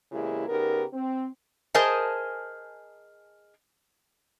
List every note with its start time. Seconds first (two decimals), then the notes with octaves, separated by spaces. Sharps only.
0.12 E2 C#3 G#3 A#3 E4 G4
0.49 C#3 B3 D#4 G4 A#4
0.93 C4
1.74 G#4 A#4 C5 D#5 G#5 A5